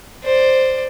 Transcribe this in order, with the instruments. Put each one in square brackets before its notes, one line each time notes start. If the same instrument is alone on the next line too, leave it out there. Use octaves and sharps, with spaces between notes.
[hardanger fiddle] C5 D5